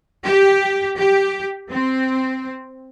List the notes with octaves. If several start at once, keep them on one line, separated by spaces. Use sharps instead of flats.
G4
G4
C4